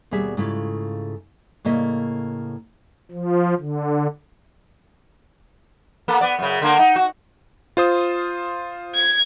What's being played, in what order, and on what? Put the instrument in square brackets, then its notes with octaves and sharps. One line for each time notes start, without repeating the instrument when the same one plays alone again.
[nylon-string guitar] D#2 B2 G3 G#4 E5
G#2 C#3 A3 E4 F4
A2 C#3 A#3 D#5 E5
[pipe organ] F3
D3
[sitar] A#3 B3 A4
B3 D5
F#2 C#3
D3 A#3
D#4
F#4
[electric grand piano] F4 C5 D#6
[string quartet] G#6